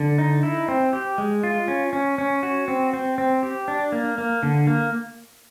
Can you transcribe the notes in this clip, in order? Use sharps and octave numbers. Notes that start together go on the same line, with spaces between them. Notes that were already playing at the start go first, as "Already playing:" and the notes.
Already playing: D3
D#4
E4
C4
G4
G#3
F4
C#4
C#4
C#4
F#4
C4
C4
C4
G4
D4
A#3
A#3
D3
A#3